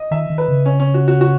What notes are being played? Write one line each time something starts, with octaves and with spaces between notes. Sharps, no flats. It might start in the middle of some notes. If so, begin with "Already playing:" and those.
Already playing: D#5
D#3 E5
D#3
B4
C#3
C#4
C#4
F#4
F#4
F#4